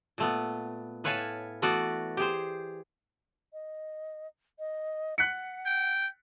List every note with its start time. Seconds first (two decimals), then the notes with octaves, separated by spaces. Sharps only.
0.18 A#2 A3 B3
1.04 A2 B4 C#5 F5 G#5 A5
1.62 E3 A3 B3 F#4 D5
2.17 G4 G#4 C5
3.53 D#5
4.59 D#5
5.18 F#5 F#6 B6 C#7
5.66 G5